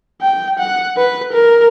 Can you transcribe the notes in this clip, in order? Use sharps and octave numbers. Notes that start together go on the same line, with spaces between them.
G5
F#5
B4
A#4